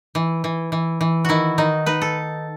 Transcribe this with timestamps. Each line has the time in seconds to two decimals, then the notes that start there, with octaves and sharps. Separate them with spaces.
0.15 E3
0.44 E3
0.72 E3
1.01 E3
1.25 D#3 E4 F#4
1.58 D#3 D#4
1.86 D#4 B4
2.02 A4